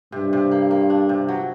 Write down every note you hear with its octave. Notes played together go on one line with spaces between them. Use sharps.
G2 C3
C3
A#3
A#3
D4
C3
F#3